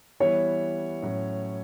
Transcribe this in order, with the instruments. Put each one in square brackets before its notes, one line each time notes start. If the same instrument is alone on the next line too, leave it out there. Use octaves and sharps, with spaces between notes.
[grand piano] E3 G3 B3 E4 [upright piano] C#5
[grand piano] A2 F#3 C#4